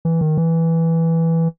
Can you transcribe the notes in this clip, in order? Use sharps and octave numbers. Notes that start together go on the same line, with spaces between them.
E3
D#3
E3